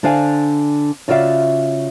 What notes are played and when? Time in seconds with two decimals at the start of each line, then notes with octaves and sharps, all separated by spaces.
0.03 D3 D4 C5 F5 G#5
1.08 C#3 F4 F#4 D5 E5 F5